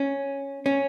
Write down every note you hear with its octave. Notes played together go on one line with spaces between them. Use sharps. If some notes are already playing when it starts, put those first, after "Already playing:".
Already playing: C#4
C#4